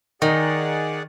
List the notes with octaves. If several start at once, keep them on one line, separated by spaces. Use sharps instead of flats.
D#3 D#4 G#4 D5 F#5